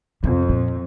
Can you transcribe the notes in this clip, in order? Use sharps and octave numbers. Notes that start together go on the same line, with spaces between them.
F2 C3
A#2